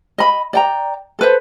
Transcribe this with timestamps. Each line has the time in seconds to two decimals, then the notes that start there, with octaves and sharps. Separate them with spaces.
0.18 D#5 B5
0.53 D5 G5 A#5
1.19 A4 B4 C5